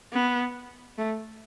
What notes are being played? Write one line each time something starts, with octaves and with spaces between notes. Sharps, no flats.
B3
A3